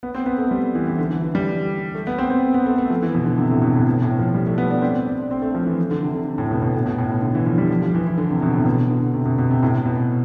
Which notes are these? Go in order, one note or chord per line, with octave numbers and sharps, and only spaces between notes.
B3
C4
B3
A3
G3
E3
E3
D3
E3
E3
G3
A3
B3
C4
C4
B3
A3
A3
F3
E3
B2
D3
C3
A2
B2
A2
B2
A2
F3
G3
A3
B3
D4
C4
D4
C4
A3
F3
E3
D3
C3
D3
A2
B2
B2
A2
B2
A2
B2
D3
E3
F3
G3
F3
F3
E3
E3
D3
C3
B2
A2
B2
D3
C3
B2
B2
C3
A2
B2